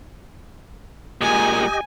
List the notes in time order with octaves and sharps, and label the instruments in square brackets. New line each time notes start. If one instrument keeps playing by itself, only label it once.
[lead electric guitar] A#2 G#3 [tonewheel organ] G4 D#5 [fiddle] G#5